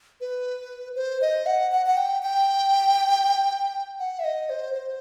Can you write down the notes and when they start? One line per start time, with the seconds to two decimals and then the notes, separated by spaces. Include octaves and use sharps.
0.21 B4
0.96 C5
1.22 D#5
1.46 F#5
1.72 F#5
1.86 F#5
1.97 G5
2.22 G5
3.99 F#5
4.19 E5
4.24 D#5
4.50 C5
4.74 C5